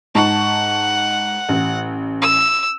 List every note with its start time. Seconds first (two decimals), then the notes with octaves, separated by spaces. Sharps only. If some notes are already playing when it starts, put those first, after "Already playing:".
0.15 G#2 F#5 A5 C#6
1.49 A1
2.22 E6